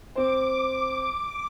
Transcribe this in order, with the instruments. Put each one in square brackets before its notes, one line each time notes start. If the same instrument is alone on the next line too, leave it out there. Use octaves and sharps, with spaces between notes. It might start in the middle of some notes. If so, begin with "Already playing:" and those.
[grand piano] C4 C5 [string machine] D6